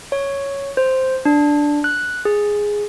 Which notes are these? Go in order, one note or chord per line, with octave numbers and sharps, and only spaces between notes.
C#5
C5
D4
F#6
G#4